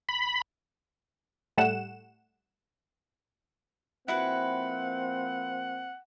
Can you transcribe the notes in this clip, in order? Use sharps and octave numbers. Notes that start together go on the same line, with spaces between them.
B5
A2 G3 A3 F#5 E7
F3 A#3 C4 E4 F#4 B4 F#5